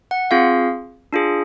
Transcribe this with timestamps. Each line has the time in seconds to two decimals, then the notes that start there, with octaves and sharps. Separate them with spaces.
0.11 F#5
0.31 C4 F4 G#4 F5
1.13 D4 F4 G#4